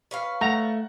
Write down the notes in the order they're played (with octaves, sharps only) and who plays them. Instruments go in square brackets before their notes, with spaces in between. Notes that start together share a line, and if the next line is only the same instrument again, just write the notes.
[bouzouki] C#4 B4 F5
[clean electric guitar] A3 [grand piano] F#5 [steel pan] A#5